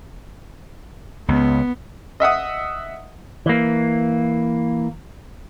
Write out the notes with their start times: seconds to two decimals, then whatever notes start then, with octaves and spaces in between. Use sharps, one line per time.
1.28 C#2 B3
2.20 D#5 E5 F#5 D#6
3.46 E3 A#3